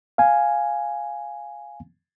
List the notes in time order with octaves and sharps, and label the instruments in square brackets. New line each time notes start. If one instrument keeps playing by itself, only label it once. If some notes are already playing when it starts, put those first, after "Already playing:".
[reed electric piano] F5 G#5